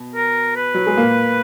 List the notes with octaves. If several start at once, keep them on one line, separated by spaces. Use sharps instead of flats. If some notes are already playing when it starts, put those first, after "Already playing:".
Already playing: B2
A#4
B4
F#3
G#3
A#2 A#3